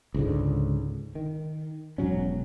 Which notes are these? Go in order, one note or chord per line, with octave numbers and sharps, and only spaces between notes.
C#2 G#2 D3
D#3
E1 B1 F#3 C#4